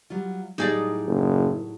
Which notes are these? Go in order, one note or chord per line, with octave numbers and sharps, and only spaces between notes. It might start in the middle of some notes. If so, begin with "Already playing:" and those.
F#3 G3 F4
A2 F#3 G3 D#4 G#4 D5
F#1